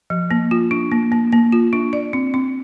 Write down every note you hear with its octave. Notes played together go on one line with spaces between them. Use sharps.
F3
A#3
F4
D4
A#3
A#3
A#3
F4
D4
D5
C4
C4